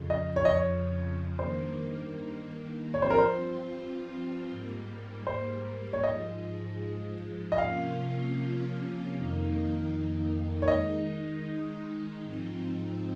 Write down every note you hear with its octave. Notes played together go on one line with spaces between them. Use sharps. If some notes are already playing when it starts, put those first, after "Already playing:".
Already playing: F2 C#3 F3
D#5
C#5
D#5
C#5
G2 D#3 A#3 C5
G2 F3 C4 F4 C#5
C5
A#4
C5
G#2 G3 A#3
C5
C#5
G#2 F3 G#3 D#5
D#5
C3 F3 A#3 C#4 F4 F5
F2 D#3 A#3 D#4
C#5
D#3 G#3 D#4 D#5
G#2 F3 C4 D#4